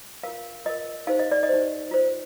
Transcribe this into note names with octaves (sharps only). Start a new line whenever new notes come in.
F4 A#4 F5
F4 A#4 D#5
D#4 G4 C5 F5
D#5
D5
D#5
D#4 G4 C5
F4 C5